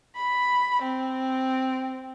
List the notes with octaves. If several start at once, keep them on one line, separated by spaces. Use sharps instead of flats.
B5
C4